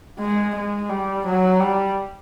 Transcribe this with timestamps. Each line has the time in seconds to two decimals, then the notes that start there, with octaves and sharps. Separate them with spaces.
0.19 G#3
0.54 G#3
0.89 G3
1.25 F#3
1.60 G3